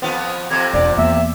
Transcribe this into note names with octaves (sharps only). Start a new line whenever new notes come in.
F2 F3 B3
F2 C3 G#6
E1 D4 D5
E2 A#3 E5